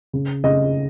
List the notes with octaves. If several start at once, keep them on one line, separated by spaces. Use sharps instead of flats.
C#3
C#3 D#5